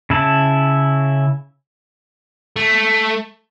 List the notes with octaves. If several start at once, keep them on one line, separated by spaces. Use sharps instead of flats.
C#3 E4 A5
A3